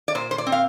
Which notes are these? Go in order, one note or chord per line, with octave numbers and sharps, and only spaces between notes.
D5
A#2 C5
C5
D5
C4
F5